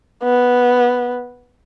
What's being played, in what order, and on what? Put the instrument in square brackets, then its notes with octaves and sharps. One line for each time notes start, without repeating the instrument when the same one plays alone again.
[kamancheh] B3